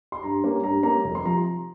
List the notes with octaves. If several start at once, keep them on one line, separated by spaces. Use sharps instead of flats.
C6
G2 A#5
G3 A#3 C#4
G2 A#5
G3 A#3 C#4 A#5
F1
C6
C3 F3 A#5